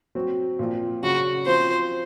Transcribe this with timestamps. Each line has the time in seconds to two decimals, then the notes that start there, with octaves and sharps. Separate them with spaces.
0.15 F#3 C4 F#4
0.59 A#2 F3 C4 F4
1.02 C#3 F#3 C#4 F#4
1.46 F3 C4 F4 C5